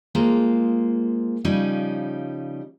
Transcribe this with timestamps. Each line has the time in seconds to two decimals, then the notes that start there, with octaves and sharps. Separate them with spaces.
0.15 G#3 A#3 F4 C5
1.45 C#3 F3 G3 C#4 D#4